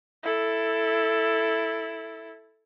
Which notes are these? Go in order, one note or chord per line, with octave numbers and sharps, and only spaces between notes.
E4 A4